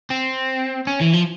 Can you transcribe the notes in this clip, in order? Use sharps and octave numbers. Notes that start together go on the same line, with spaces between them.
C4
C#4
E3
F3